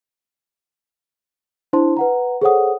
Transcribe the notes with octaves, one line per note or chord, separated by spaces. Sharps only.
D4 E4 C5 A5 C6
B4 F#5 A#5
G#4 A4 C5 C#5 F#5 D#6